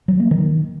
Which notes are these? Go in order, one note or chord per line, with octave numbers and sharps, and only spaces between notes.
F#3
A#3
D#3